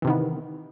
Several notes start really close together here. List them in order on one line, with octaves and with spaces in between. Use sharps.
E3 C3 D#3 B3